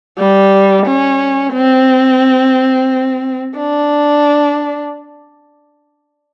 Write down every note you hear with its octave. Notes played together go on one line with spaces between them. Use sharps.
G3
C#4
C4
D4